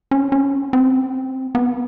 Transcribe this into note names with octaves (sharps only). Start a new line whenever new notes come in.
C#4
C#4
C4
B3